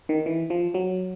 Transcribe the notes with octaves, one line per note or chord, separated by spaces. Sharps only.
D#3
E3
F3
F#3